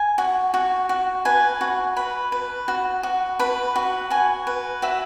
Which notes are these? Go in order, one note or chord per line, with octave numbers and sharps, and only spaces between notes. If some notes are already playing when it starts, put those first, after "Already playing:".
Already playing: G#5
F#4
F#4
F#4
B4 G#5
F#4
B4 B5
B4
F#4
F#4
B4 B5
F#4
F#4 G#5
B4
F#4 E5